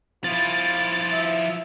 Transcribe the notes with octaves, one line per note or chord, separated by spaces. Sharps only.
F3 E4 F4 A6
E5